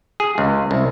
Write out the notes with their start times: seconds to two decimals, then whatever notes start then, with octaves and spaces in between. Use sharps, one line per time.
0.20 G#4
0.38 C#2
0.71 C2